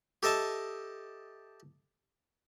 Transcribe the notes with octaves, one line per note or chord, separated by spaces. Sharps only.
G4 A4 D#5 E5 A5